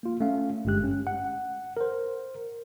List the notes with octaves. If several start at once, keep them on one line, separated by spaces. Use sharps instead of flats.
A#3 F4
A3 C#4 F5
G1 G2 G#3 G4 F#6
C#4
F#5
A#4 C5